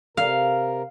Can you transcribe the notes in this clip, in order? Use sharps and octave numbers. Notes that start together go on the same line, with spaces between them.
C3 A#4 F5